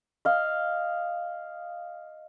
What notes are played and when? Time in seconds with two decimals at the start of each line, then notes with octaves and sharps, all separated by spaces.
0.25 D#5 F5